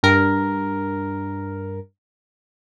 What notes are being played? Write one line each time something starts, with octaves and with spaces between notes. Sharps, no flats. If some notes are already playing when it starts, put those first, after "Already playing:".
G2 A#4